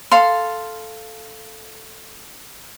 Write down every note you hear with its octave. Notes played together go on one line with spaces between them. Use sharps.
A4 F5 C6